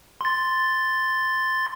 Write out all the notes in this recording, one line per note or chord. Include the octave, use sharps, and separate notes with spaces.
C6 A6